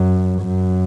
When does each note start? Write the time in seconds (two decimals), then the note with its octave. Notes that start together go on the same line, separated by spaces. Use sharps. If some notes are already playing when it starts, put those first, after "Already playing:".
Already playing: F#2
0.41 F#2